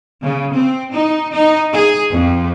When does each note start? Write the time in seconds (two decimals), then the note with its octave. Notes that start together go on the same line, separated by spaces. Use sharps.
0.22 C#3
0.52 C4
0.92 D#4
1.30 D#4
1.73 G#4
2.11 F2